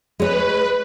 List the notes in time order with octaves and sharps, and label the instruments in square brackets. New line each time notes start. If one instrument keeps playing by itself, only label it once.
[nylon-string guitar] G#3 C#5 [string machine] B4